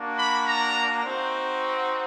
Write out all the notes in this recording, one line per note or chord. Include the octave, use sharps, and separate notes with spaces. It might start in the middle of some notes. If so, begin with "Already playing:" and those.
Already playing: A#3 D4 F#4
B5
A#5
C4 D#4 F#4